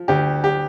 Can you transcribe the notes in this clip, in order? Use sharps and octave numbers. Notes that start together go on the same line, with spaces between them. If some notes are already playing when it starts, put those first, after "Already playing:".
Already playing: F3
D2 G4
G4